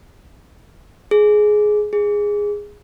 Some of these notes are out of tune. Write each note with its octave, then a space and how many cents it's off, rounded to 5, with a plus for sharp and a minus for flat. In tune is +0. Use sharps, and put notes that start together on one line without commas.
G#4 +15
G#4 -10